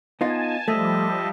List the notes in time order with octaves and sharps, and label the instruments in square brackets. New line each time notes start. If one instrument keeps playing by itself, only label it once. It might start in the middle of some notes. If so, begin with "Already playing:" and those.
[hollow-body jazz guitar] B3 D#4 F4 [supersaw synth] G#5 A5
[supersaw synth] F3 G3 [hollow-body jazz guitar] A3 [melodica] D#5 E5 A5